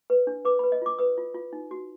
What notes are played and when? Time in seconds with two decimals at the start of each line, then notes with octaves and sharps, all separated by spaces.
0.10 B4
0.27 D4
0.45 B4 D6
0.59 B5
0.64 B4
0.72 D#5
0.82 F4 D6
0.99 B4 D#6
1.18 F4
1.35 F4
1.53 D#4
1.71 F#4